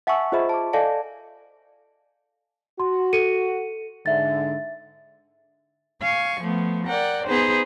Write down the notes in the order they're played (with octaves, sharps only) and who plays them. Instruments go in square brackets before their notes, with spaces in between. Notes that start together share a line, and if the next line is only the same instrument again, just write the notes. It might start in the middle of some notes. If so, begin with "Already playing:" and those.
[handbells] E5 F#5 G#5 A5 C#6 E6
F4 G#4 C5 D#5 E5 B5
A5 D6
A4 D5 D#5 F5 G#5 A5
[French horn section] F#4 [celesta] C6
[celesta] A4 C#7 D#7
[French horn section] G#2 D3 [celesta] E5 A6
[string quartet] F5 G#5 C#6
F3 A3 B3
A#4 D5 F#5 G5
B3 D#4 G#4 B4 C5